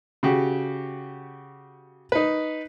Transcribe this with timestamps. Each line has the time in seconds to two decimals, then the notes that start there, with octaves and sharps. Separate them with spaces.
0.23 C#3 F#4 G4
2.12 D#4 B4